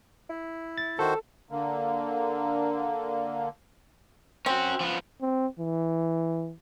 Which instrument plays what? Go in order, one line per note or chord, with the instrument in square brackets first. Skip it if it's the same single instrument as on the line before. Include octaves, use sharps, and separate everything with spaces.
[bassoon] E4
[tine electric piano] A6
[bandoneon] D#3 F#4 C5 [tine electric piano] A4
[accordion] D3 A#3
[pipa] C4 [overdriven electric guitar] C#4 F#4
[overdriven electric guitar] F3 B3
[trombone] C4
E3